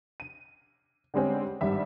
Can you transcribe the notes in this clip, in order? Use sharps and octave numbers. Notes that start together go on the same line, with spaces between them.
D#7
D3 G3 G#3 C4 C#4
G#1 G2 G3 E5